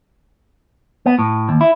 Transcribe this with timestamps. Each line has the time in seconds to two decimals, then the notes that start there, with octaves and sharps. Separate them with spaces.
1.06 B3
1.19 A2
1.49 D#2
1.61 E4